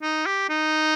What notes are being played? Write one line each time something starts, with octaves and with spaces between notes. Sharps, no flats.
D#4
G4
D#4